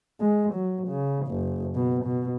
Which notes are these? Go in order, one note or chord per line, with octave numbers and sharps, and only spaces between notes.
G#3
F#3
C#3
F#1
B2
B2